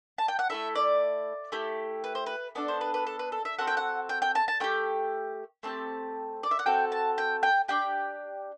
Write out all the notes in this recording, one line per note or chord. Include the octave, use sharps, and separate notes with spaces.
A5
G5
F#5
A3 E4 A4 E5
D5
A3 E4 G4
B4
C5
B4
B3 D4 A4 D5
C5
B4
B4
A4
B4
A4
E5
C4 F#4 A4 F#5
G5
F#5
G5
G5
A5
A5
A3 E4 G4 G5
A3 C4 G4 A5
D5
E5
F#5
C4 F#4 A4 G5
A5
G5
G5
D4 G4 G5